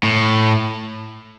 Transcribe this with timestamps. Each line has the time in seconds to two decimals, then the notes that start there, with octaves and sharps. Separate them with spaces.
0.03 A2